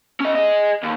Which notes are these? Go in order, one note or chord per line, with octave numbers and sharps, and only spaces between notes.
C#4 D#5
G#4 D#5
D#2